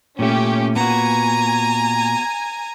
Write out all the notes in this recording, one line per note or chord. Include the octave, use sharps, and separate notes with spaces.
A#2 A3 C#4 G4
A#2 B3 F#4 G#5 A#5